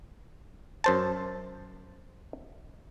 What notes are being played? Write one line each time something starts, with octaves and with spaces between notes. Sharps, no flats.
F#2 C5 A5